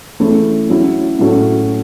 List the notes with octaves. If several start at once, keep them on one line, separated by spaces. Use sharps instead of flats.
E3 A3 C#4 E4
F#3 C#4 E4
A2 F#3 A3 C#4